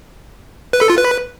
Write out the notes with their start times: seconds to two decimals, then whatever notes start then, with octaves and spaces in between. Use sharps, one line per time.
0.73 B4
0.81 A4
0.90 F4
0.98 B4